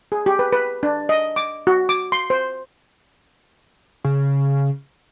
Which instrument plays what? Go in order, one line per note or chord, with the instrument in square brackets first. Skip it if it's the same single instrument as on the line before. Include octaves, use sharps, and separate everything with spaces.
[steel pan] G#4
G4
B4
B4
D4
D#5
D6
F#4
D6
C6
C5
[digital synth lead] C#3